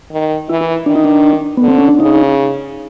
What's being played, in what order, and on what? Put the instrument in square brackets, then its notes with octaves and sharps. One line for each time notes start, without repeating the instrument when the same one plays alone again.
[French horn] D#3
[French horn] E3 [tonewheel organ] E4
[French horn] D#3 [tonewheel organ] D4
[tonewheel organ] D#4
D4
[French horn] D3 [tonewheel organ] B3
[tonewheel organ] C4
C#4
D4
[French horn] C#3 [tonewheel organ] D#4